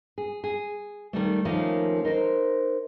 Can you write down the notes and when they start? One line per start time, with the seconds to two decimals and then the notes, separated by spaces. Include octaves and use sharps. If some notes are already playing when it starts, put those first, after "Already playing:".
0.18 G#4
0.44 G#4
1.13 D#3 G3 A3
1.45 D#3 F3 A3 A#3 C#4
2.05 D#4 A#4 C5